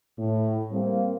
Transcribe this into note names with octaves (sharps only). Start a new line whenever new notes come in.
A2
G3 A#3 C4